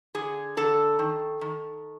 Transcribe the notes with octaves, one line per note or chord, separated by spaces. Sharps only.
D3 G#4
D3 A4
D#3
D#3